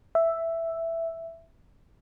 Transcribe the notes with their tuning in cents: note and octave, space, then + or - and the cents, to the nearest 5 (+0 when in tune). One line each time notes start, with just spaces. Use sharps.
E5 +5